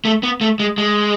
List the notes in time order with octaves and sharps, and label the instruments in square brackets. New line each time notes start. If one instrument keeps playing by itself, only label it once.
[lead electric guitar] A3
B3
A3
G#3
G#3